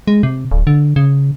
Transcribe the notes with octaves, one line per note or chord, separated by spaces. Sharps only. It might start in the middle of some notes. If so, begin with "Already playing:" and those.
G#3
C3
D1
D3
C#3